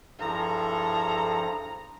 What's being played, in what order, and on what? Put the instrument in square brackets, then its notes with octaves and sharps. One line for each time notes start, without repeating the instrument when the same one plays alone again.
[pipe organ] G2 F3 [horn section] E4 G#4 A4 [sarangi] A#5